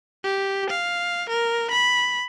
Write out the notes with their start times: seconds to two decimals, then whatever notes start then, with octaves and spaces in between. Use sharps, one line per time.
0.24 G4
0.70 F5
1.29 A#4
1.71 B5